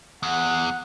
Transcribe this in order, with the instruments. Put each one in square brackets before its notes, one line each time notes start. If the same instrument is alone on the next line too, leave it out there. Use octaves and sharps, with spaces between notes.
[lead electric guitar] E2 [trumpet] F#5